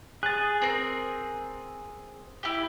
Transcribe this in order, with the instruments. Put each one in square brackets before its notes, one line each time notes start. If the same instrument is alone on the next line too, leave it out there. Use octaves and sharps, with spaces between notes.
[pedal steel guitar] G#4 [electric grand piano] F#6 A6
[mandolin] C4 A#4
E4 G4